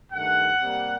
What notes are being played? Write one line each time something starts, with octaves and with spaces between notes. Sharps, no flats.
G2 D#3 A3 F#5
C3 G3 A#3